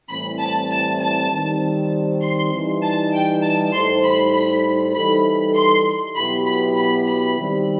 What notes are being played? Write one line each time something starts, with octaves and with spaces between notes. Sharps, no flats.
A2 E3 G3 C4 B5
A5
A5
A5
D#3 G3 C4
C6
E3 G3 D#4
A5
G5
A5
A2 G3 D#4 A4 C5 C6
B5
B5
E3 G3 D#4 A4 B5
C6
B2 F#3 B3 E4 G4 B5
B5
B5
B5
D#3 G3 C4